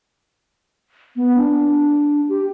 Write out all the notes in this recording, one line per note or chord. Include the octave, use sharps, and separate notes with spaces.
B3
D4
G4